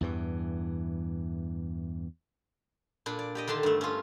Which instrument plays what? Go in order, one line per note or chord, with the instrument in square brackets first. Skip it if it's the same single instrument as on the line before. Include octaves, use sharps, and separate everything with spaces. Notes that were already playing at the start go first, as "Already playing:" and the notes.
[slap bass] E2 G2 E3
[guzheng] A#2 D4 B5
D5
G4 D5 D#5
D3 D#3 D4 A5 C6
G2 A3
C#4 F4